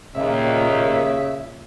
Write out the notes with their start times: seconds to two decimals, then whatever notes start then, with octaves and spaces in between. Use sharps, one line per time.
0.15 D#2 A#2 C#3 E5